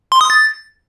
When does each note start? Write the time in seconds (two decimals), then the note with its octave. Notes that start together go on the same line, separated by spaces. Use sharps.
0.12 C6
0.21 D#6
0.30 A6